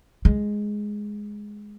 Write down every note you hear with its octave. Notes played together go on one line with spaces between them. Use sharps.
G#3